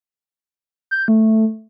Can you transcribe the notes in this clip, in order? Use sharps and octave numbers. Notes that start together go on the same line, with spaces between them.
G6
A3